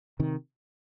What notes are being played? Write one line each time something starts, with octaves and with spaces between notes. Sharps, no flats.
C3 D#3